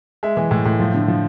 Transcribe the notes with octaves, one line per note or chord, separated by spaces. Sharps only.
G#3 E5
E3
A2
A2
F3
D3
F3